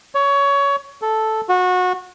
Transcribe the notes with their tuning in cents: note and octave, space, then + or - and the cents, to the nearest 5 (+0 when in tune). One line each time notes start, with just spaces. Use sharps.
C#5 +20
A4 -5
F#4 -25